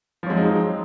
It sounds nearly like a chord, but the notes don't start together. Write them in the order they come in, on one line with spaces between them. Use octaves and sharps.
F3 F#3 G#3 C4 D#4